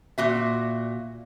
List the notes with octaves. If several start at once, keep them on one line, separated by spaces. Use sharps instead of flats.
A#2 F#4 E5